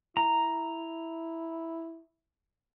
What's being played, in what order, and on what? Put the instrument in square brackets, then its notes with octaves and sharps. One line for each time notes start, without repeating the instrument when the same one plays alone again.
[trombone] E4 [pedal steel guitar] A#5